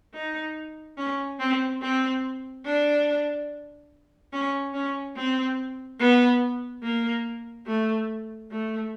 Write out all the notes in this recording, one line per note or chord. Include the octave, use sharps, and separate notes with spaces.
D#4
C#4
C4
C4
D4
C#4
C#4
C4
B3
A#3
A3
A3